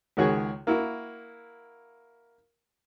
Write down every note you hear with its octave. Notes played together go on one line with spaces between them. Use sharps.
C#2 D#3 F#4 G#4 C#5
A#3 E4 F#4